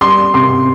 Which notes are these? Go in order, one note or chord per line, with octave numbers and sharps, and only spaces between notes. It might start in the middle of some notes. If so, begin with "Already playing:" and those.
G3 C6
C3 C6